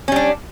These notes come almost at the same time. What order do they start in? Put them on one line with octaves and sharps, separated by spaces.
C#4 G3 D4